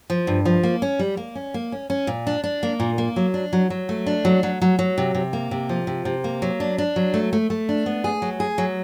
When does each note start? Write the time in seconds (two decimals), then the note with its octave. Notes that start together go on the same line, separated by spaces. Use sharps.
0.10 F3
0.27 G2
0.45 F3
0.63 A#3
0.82 C#4
0.99 G3
1.17 A#3
1.35 C#4
1.54 A#3
1.72 C#4
1.90 C#4
2.07 A#2
2.27 D4
2.44 D4
2.63 A#3
2.80 A#2
2.98 A#3
3.16 F#3
3.34 D4
3.53 F#3
3.70 F#3
3.89 A3
4.06 D4
4.25 F#3
4.43 F#3
4.62 F#3
4.79 F#3
4.98 C3
5.15 C3
5.33 A#3
5.51 C3
5.69 F3
5.87 C3
6.05 C3
6.24 A#3
6.42 F#3
6.60 D4
6.78 D4
6.96 F#3
7.14 A3
7.33 A3
7.50 A3
7.69 D4
7.86 B3
8.04 G#4
8.22 F#3
8.40 G#4
8.58 F#3